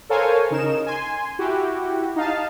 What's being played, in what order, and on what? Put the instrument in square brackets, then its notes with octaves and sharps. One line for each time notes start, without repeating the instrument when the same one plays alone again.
[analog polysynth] A4 A#4 C5 C#5 F5 G#5
C#3 D#4 A#4 E7
G#5 C6
E4 F#4 G4
D#4 F5 A5